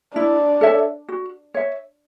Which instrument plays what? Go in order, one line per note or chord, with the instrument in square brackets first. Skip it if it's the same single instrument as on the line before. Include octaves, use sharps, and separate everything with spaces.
[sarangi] D4 [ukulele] E4
[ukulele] A4 C#5 E5
F#4
C#5 E5